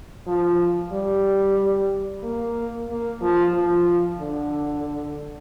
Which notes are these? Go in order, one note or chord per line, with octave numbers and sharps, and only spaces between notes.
F3
G3
A#3
A#3
F3
F3
D3